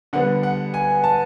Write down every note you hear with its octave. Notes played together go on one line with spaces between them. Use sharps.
D3 G3 B3 D4 F#5
F#5
G#5
A5